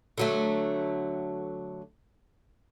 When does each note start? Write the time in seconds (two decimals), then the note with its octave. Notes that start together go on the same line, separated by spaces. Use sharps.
0.18 D3 F#3 A3